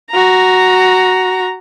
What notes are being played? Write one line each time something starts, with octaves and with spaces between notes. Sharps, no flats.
F#4 A#5